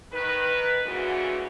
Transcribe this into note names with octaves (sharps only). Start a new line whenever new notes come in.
D#3 B4
D2 C#3 E3 F#4